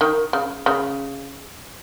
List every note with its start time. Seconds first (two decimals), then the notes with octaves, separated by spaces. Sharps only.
0.01 D#3
0.33 C#3
0.66 C#3